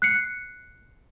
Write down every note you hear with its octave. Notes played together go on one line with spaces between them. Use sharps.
F#6 C7 C#7